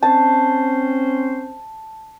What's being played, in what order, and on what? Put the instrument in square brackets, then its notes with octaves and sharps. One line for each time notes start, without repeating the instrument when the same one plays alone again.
[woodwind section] C4 C#4 C5 [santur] A5